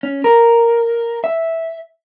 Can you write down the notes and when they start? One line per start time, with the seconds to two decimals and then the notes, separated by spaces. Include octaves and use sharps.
0.03 C#4
0.24 A#4
1.24 E5